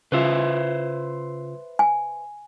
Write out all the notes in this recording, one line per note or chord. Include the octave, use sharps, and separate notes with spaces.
C#3 F4 B4 C5 E5
G#5